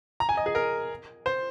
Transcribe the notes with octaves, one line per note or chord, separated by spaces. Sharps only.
A#5
G#5
D#5
G#4
A#4
C5